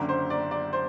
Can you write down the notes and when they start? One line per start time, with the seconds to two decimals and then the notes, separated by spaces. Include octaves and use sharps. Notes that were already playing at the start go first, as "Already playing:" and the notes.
Already playing: F#1 F#2 D3
0.09 C5
0.30 D5
0.51 D5
0.73 C5